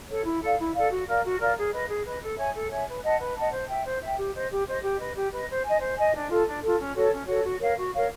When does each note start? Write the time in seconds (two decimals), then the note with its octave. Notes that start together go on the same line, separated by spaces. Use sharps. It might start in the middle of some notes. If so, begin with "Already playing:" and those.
0.08 A4 C#5
0.24 E4
0.40 A4 D5 F5
0.57 E4
0.74 A4 D5 F5
0.89 F#4
1.06 A#4 D5 F5
1.23 F#4
1.39 A#4 D5 F5
1.56 G#4
1.71 B4 D#5
1.87 G#4
2.04 B4 D#5
2.21 A4
2.37 C#5 E5 G#5
2.53 A4
2.69 C#5 E5 G#5
2.87 B4
3.03 D#5 F#5 A5
3.18 B4
3.35 D#5 F#5 A5
3.51 C5
3.67 E5 G5
3.85 C5
4.00 E5 G5
4.16 G4
4.34 C5 D#5
4.49 G4
4.66 C5 D#5
4.81 G4
4.98 B4 D#5
5.14 G4
5.31 B4 D#5
5.48 C5
5.63 D#5 G#5
5.79 C5
5.97 D#5 G#5
6.13 D4
6.29 F4 A4
6.45 D4
6.61 F4 A4
6.78 C#4
6.94 F#4 A4 C#5
7.11 C#4
7.26 F#4 A4 C#5
7.43 F#4
7.60 A#4 C#5 F5
7.76 F#4
7.93 A#4 C#5 F5